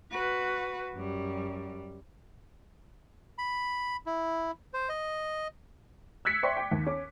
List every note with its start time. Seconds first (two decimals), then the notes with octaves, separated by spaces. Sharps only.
0.12 F#4 B4
0.94 F#2 G3
3.38 B5
4.06 E4
4.73 C5
4.89 D#5
6.25 E6 F#6 G#6 B6 C#7
6.43 C5 D5 E5 G5 C6 C#6
6.57 G5 D6
6.71 D#2
6.86 C#4 D6